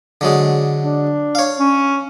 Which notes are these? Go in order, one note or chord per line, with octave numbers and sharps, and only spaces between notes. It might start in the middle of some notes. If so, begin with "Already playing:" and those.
D3 F#3 G#3
D4
C#5 F5
C#4